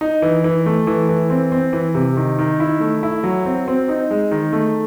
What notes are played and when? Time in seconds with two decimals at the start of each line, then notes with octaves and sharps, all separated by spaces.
0.01 D#4
0.22 E3
0.44 E3
0.66 A3
0.87 E3
1.09 E3
1.30 C4
1.52 C4
1.73 E3
1.95 C3
2.17 D#3
2.39 D#3
2.60 E4
2.80 A3
3.03 E4
3.23 F#3
3.46 C4
3.68 C4
3.89 D#4
4.11 G#3
4.31 D#3
4.53 A3